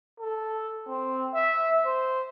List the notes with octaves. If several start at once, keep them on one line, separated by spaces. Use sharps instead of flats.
A4
C4
E5
C5